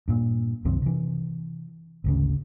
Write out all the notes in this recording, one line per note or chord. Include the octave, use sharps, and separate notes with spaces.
G2 A#2
C2 F#2 D#3 C4
C3 E3
G#1 D2 C#3